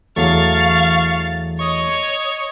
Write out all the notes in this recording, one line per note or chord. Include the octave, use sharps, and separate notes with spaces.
E2 F#3 A3 F5 C#6 A6
C#5 D#5 C#6